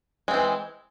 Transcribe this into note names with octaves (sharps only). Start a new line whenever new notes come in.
E3 G#3 C4